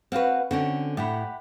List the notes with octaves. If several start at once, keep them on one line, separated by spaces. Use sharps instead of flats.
C4 F#4 B4 F5 F#5
D3 C4 C#4 F#4
A2 G4 F#5 B5